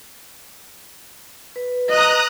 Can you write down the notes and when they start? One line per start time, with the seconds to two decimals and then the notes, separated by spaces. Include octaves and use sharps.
1.56 B4
1.89 D#5 A#5 D#6 F#6